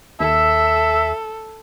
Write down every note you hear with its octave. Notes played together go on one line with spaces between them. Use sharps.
D#2 A4 E5